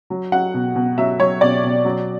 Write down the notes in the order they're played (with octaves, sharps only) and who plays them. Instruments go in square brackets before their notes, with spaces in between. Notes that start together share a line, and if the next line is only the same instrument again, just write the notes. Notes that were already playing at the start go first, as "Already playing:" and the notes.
[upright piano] F#3
F#3 F#5
B2
B2
F#3 E5
F#3 C#5
B2 D5
B2
F#3